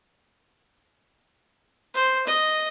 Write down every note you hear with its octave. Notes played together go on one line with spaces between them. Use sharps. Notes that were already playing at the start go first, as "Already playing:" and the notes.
C5
D#5